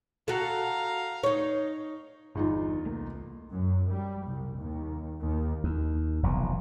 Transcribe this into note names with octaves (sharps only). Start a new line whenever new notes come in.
F#4 A4 F5 A#5
D#4 C#5
G1 E2 G2 D#4 F4
C2 A3 A#3
F#2
G3
C2
D#2
D#2
D#2
F1 B1 F2 E3